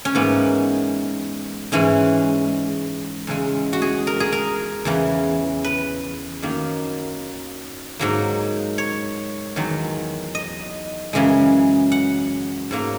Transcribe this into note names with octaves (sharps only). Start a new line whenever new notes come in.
C#4
G#2 E3 A#3 B3
G#2 E3 G#3 C#4
E2 C#3 G#3
F#4
G#4
A#4
G#4
A#4
E2 C#3 E3
B4
F#2 D#3 A#3
G#2 F#3 A#3
C#5
E2 D#3 F#3
D#5
F#2 C#3 E3 G#3
F#5
G#2 F#3 A#3